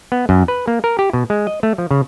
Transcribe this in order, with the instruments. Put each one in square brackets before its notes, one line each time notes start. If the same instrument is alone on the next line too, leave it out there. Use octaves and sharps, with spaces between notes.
[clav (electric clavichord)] B3
F#2
B4
A#3
A#4
G4
B2
G#3
D#5
A3
F3
C#3